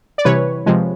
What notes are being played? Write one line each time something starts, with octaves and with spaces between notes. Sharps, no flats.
D5
C3 E3 G3 B4 C#5
C3 F3 G#3